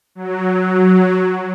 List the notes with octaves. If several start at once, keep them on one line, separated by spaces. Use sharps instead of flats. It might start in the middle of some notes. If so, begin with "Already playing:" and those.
F#3